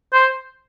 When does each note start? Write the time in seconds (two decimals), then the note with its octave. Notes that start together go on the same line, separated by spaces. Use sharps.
0.13 C5